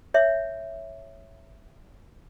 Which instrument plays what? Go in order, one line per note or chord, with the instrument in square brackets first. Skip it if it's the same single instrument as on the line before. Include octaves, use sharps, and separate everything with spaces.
[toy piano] C#5 E5